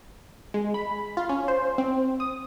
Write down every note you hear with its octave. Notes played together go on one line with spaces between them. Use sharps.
G#3
B5
F4
C#4
C5
C4
D#6